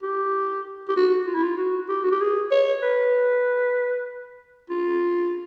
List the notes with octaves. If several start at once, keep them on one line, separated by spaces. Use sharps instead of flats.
G4
G4
F#4
F4
E4
F4
F#4
G4
F#4
G4
G#4
C#5
B4
F4